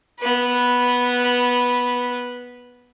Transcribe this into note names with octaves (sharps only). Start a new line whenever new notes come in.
B3 B4